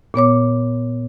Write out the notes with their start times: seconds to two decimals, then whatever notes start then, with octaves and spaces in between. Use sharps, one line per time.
0.14 A#2 B3 C#5 D6